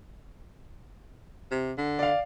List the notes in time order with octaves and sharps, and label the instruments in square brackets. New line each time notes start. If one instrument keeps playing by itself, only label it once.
[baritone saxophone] C3
D3
[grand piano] D5 F5